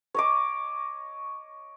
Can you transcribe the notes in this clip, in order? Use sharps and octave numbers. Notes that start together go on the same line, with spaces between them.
C#5 D#5 D6